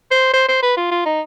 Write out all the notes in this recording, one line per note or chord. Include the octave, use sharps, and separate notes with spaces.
C5
C5
C5
B4
F4
F4
D#4